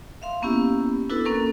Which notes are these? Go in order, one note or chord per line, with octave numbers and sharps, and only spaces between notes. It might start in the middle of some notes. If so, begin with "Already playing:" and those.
E5 F5 C6
A#3 B3 C#4 E4 G4
B3 D4 E4 F#4 A4 B4
A#3 C#4 A4 A#4